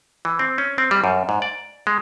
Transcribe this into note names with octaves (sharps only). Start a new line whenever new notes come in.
E3
C4
C#4
C4
G3
F#2
G#2
D5
G#3